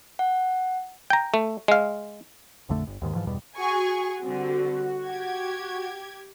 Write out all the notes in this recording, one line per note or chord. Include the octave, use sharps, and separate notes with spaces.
F#5
G5 A#5
A3
G#3 F5
A#1 F2 D3 A3
G1
D#2 G#2 D#3
G#2 E3 F3
E2 G2 B2 G3
F#4 G#4 G#5 C#6
D3 G3 C4
G4 G#6